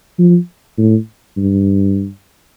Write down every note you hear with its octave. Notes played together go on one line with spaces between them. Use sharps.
F3
A2
G2